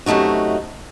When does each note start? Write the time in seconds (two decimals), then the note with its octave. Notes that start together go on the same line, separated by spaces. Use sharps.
0.06 F#2 C3 A3 D#4 F#4